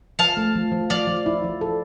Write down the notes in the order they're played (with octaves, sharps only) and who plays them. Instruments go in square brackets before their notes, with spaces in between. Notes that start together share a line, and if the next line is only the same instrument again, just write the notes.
[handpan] F3 [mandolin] F5 A5
[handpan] A3
F3
F3
[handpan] F3 [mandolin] D5 F5
[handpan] F3
E4
F3
A4